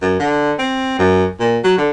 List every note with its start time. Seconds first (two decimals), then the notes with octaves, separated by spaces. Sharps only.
0.02 F#2
0.20 D3
0.59 C4
0.99 F#2
1.40 A#2
1.64 F#3
1.78 D3